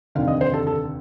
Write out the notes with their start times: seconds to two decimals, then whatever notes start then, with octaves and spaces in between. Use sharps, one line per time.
0.15 F1 D#2 D3 F5
0.28 D#5
0.41 C5
0.54 A4
0.67 A4